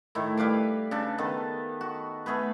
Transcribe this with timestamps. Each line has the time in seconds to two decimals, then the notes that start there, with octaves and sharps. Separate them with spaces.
0.15 A2 D#3 E4
0.37 G3 B4 F5 D6
0.91 C#3 D4 A4
1.18 D#3 B3 A4
1.81 F#4
2.26 A3 B3 G#4 B4